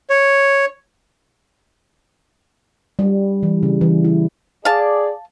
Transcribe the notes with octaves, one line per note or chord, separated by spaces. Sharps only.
C#5
G3
E3
C#3
E3
E4
G#4 D5 F5 A5